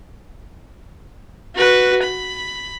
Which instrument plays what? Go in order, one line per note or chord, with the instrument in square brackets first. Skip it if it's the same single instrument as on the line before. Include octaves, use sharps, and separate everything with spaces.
[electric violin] F#4 B4
B5